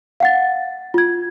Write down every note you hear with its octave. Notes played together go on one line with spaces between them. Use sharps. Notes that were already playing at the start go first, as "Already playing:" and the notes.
F5 F#5 A6
F4 G#6